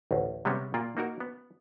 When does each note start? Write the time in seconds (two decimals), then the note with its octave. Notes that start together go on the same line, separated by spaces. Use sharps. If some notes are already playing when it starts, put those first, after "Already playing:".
0.11 A1 D2
0.45 C3 G3 G#3 B3 C#4
0.74 A#2 A#3 F4 D5
0.97 A#3 D#4 F#4 A#4
1.20 B3